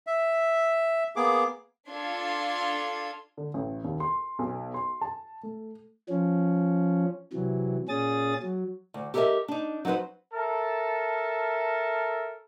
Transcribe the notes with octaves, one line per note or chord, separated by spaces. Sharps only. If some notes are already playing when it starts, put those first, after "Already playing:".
E5
A#3 B3 G#4 D6
D4 F4 A4 C6 G#6
D3
A1
D#2
C6
B1
C6
A5
A3
F3 C#4
C3 E3 F#3
A#2 C#4 G#4 D#6 A6
F#3
D2
G4 A4 A#4 C#5 D#5 E5
D4 D#4
F#3 D#4 E4 B4 C5
A4 A#4 E5 A5